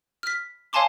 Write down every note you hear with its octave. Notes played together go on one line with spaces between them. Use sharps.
F6 B6
C#5 F5 G#5 A5 C6 D6